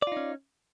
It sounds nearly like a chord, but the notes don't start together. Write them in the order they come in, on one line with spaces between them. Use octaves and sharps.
D5 F4 D#4 C#4